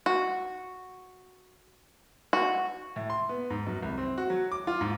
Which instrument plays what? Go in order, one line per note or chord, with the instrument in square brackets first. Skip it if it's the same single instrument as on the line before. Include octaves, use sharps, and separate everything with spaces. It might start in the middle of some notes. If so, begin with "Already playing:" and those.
[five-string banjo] F#4
F#4
[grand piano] A2
C6
B3
G#2
F#2
C2
C4
F#4
F#3
D6
F4
G#2